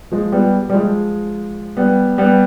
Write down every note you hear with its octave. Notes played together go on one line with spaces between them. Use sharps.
F3 G#3
G3 B3
G3
F3 G#3
G3 B3
G3 B3